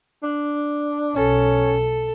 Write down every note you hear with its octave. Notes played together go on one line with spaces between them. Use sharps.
D4
B1 C#4 A4